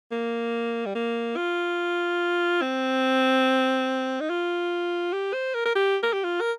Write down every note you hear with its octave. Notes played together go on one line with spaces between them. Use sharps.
A#3
G3
A#3
F4
C4
D#4
F4
G4
C5
A#4
A#4
G4
A#4
G4
F4
A#4